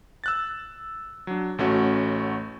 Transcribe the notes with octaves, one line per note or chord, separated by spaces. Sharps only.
E6 F#6 A6
F#3 D4
A1 A3 C#4 F#4